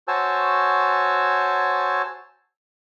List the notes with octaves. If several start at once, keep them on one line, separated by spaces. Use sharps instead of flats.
F#4 C5 C#5 G#5 A5 E6